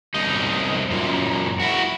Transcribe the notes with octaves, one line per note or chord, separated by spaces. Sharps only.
C2 D#4
F#2 A#2
E4 F#4